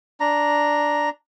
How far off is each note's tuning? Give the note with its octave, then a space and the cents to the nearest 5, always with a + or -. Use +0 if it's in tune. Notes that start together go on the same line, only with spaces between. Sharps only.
D4 -5 A#5 +0